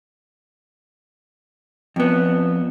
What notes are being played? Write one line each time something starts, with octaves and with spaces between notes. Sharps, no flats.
F2 B3